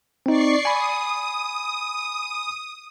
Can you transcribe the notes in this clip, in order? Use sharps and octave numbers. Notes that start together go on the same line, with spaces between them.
C4 D#4 D5 C#6 C7
G#5 B5 D#6